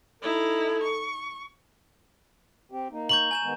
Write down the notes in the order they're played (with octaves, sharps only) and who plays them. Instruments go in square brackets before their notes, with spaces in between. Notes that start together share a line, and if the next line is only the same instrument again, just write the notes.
[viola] D#4 E4 [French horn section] A4
[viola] C#6
[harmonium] C4 G4
A#3 D#4
[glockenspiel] A#5 C#6 G6 [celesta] F#7
[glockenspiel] G#5 G6 E7
[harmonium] D#3 G#3 B3